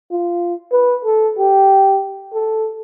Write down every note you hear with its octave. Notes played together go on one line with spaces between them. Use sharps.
F4
B4
A4
G4
A4